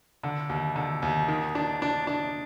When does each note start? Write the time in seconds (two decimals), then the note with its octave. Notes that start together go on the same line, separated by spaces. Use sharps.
0.23 D3
0.49 D#2
0.76 D3
1.02 D#2
1.28 D#3
1.55 D4
1.82 D4
2.07 D4